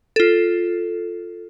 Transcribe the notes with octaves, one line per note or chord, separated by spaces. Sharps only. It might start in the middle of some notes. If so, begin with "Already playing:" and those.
F4 A4